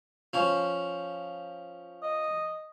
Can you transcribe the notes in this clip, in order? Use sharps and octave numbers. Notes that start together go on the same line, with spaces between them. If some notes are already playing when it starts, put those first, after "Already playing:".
F3 C#4
D#5